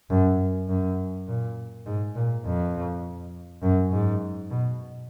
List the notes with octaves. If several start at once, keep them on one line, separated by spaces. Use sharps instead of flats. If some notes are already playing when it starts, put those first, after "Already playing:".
F#2
F#2
A#2
G#2
A#2
F2
F#2
G#2
B2